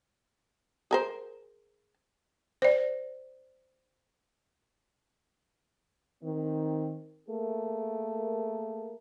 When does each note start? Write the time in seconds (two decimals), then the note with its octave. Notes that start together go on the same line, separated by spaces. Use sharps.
0.91 G#4 A#4 C5
2.62 C5 D5
6.24 D#3 C4
7.29 A3 A#3 G#4 A#4